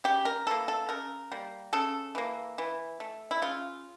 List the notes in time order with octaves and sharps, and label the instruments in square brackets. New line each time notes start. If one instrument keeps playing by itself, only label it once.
[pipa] C#3 G4
A#4
E3 A#3 A4
A4
C#3 A#4
G3 A#3
C#3 A4
E3 A#3
E3
A3
E4
C#3 F4